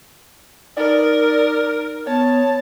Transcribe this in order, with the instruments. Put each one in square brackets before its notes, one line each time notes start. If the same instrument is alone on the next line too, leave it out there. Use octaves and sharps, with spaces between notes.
[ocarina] D#4 [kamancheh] A#4 [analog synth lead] D5
[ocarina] B3 [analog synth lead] C#5 [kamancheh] A5